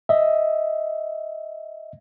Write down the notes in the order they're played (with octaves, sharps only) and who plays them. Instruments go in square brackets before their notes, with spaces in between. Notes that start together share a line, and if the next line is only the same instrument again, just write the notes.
[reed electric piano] D#5 E5